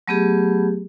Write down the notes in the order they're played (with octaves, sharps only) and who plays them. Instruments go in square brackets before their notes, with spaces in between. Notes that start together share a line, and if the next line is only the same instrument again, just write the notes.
[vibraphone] F#3 A3 B3 G4 G#4